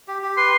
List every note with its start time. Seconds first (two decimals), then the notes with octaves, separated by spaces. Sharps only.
0.08 G4
0.22 G4
0.37 B4 C6